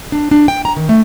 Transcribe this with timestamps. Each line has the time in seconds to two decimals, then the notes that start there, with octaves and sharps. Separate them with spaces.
0.12 D4
0.31 D4
0.48 G5
0.65 A#5
0.76 D#3
0.89 A3